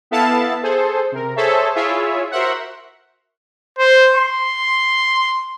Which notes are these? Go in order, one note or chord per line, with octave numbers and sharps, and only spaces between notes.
B3 E4 A4 E5 F5 A5
G#4 A4 C5
C3 A#4
G#4 A4 C5 C#5 E5
E4 F4 G#4 C#5 E5
F#4 A#4 C5 E5 F#5
C5
C6